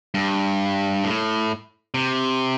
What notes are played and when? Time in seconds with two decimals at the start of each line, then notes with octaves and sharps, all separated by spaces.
0.14 G2
1.04 A2
1.94 C3